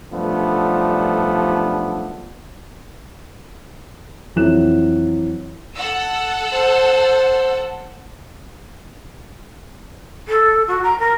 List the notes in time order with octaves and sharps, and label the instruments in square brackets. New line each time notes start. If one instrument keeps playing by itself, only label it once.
[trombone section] B1 G2 F3 A3 B3 D4
[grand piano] F2 E3 F#3 F#6 E7
[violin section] A4 F#5 E6
[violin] C5
[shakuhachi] A4
F#4
A#5
A#4